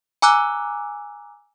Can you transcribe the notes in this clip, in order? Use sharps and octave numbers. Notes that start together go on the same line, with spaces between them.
G#5 A#5 D6 E6 F#6